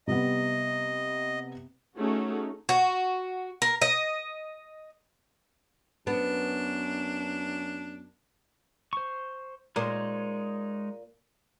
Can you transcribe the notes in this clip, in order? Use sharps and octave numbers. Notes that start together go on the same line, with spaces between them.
C3 G3 B3 D#5
A3 C#4 D#4 F#4 G#4
F#4
A#4
D#5
F#2 B3 D4
C5 C#6
A#2 G#3 D#4 A#4 C5 C#5